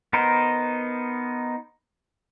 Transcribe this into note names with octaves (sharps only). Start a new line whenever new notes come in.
B3 D#4 A#4 C5